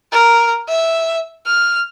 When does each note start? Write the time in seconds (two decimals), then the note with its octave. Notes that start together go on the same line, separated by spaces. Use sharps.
0.12 A#4
0.68 E5
1.47 F6